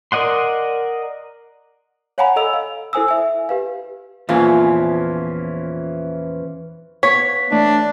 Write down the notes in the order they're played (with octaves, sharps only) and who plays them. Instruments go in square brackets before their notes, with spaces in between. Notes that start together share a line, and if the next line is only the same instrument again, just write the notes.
[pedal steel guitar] A#4 D5 D#5 F#5 C6
[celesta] C#5 F5 F#5 G#5 A#5 B5
A4 D#5 E6 F7
F5
E4 A4 C5 G#5 D#6 E6
E5 G#5
G4 B4 F5
[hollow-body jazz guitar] E2 A#2 F4 [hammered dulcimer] E3 F3 C#4
[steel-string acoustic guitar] B3 F5 [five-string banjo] C#5 [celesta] B6
[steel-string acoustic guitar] E3 A3 [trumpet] D4